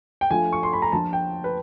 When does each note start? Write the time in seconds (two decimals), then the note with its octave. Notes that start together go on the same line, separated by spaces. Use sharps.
0.21 G5
0.31 F3 A3 D4 F4 G#5
0.53 C#6
0.63 C6
0.73 B5
0.82 A#5
0.92 F3 A#3 D4 F4 A5
1.13 G5
1.44 B4